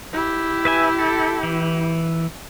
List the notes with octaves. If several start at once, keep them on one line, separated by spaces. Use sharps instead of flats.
E4 G4
B4 E5 G#5
A4
E3